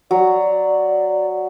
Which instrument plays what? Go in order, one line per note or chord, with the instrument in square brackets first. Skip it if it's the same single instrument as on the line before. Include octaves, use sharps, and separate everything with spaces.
[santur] F#3 [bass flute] D5